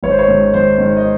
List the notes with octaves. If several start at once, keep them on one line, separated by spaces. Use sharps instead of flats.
G#1 C#5
C5
C#5
G#2 D#3
G#1 C5
G#2 D#3
D#5